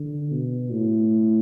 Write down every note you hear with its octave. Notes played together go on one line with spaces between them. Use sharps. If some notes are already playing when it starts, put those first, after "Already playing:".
Already playing: D3
B2
A2